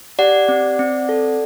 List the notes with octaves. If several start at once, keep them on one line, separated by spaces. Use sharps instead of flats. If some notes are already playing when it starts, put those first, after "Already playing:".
G4 D5 F#5
C4
C4
A4